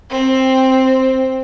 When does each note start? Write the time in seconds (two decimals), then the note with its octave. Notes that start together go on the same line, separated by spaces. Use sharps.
0.10 C4